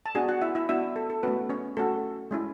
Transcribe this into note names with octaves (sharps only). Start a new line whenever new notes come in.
A5
B3 D4 F#4 G#4 G#5
F#4 F#5
E4 E5
E4 E5
B3 D4 E4 F#4 E5
A4
A4
A3 B3 C#4 F#4 B4
C#4 C#5
A3 C#4 F#4 A4
G#3 C#4 E4